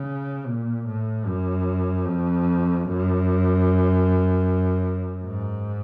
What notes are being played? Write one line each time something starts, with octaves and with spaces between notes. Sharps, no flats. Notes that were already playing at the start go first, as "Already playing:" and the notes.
Already playing: C#3
A#2
A2
F#2
F2
F#2
G#2